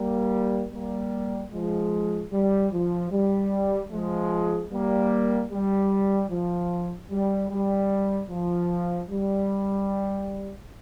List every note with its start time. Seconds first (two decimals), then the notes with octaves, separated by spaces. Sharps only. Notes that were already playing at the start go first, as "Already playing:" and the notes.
Already playing: G3 A#3
0.73 G3 A#3
1.52 F3 G#3
2.32 G3
2.72 F3
3.12 G3
3.91 F3 G#3
4.71 G3 A#3
5.51 G3
6.31 F3
7.10 G3
7.50 G3
8.30 F3
9.10 G3